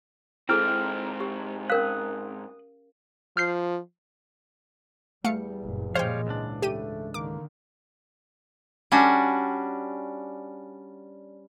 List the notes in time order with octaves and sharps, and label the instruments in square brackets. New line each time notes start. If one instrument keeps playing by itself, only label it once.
[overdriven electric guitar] G#2 C4 [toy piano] E4 G#4 A4 [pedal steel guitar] G5 F6
[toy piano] G4
[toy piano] C#4 A#4 F5 [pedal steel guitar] D#6 F#6
[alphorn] F3 [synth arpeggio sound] F6 G6 C7
[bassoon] E2 [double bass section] G3 [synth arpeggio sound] A3 F5 C#7
[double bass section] F#1 A#2
[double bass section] A#2 F3 [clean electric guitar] G3 C#5 F5 [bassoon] G#3 [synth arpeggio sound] C5 G5
[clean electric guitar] C#2 G#2 D4 [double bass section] E3
[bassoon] A3 [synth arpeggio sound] G4 G5 D#7
[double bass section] D3 D#3 [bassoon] A#3 [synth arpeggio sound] D6
[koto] G3 C#4 D4 F#4